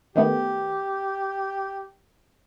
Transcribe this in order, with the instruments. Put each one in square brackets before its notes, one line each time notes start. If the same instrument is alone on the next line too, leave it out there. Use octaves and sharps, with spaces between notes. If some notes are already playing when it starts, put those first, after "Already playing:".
[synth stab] D#3 A3 B3 [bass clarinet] G4